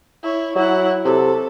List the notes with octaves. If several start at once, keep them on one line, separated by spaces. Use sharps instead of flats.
E4 C#5
F#3 E4 F#5
C3 A4